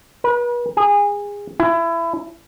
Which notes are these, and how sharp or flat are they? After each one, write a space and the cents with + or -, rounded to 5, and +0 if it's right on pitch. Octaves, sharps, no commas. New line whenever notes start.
B4 -40
G#4 -25
E4 +25